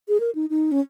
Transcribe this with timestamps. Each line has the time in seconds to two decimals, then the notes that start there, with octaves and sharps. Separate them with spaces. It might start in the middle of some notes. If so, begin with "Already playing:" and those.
0.09 G#4
0.20 A#4
0.35 D#4
0.50 D#4
0.72 C#4